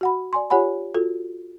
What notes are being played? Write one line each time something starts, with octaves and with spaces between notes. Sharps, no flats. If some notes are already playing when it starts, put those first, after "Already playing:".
F#4 F#5 B5
D5 G#5 C6
F4 G4 C#5 F#5 G#5 B5
F4 F#4 A4